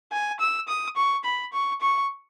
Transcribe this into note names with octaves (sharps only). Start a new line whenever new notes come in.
G#5
E6
D#6
C#6
B5
C#6
C#6